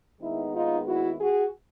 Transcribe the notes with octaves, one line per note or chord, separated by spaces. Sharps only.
D#2 D#3 G#3 B3 D#4 E4
D#4 F4
E4 F#4
F#4 G#4